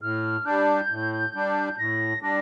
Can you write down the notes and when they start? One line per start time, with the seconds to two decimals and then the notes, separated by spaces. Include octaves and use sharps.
0.02 A2 F6
0.45 G3 D4 G6
0.90 A2
1.34 G3 D4
1.78 A2 A#6
2.22 G3 D4 A#6